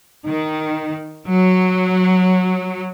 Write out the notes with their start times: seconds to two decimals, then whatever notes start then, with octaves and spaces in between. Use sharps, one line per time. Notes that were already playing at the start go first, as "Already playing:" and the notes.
0.24 D#3
1.26 F#3